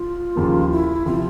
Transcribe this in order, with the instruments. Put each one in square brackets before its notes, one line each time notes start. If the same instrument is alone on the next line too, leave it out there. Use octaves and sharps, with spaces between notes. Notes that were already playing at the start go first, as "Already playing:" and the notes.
Already playing: [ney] F4
[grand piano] D#2 C#3 F3 A#3
[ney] E4
[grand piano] C3 F3 [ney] F4